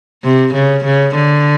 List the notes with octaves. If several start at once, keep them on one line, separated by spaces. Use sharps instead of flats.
C3
C#3
C#3
D3